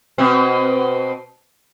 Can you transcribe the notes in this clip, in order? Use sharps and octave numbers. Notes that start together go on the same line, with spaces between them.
B2 C4